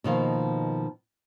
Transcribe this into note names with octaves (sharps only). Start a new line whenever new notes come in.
B2 D#3 F3 A#3